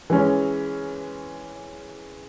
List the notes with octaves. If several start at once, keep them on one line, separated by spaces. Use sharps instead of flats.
E3 G#3 C#4